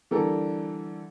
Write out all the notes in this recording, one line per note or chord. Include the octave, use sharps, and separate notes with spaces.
D3 E3 G3 A4 A#4